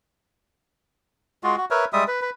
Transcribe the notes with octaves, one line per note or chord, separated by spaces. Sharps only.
G#3 F4 F#4
F#4
A#4 B4 C#5 E5
G3 G#3 E5 D#6
B4
B4